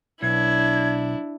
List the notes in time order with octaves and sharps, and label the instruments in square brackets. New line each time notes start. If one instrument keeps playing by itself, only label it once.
[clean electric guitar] B1 [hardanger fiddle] D4 E4 [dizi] G#6